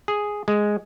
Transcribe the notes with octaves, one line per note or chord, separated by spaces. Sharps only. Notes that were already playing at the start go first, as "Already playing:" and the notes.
G#4
G#3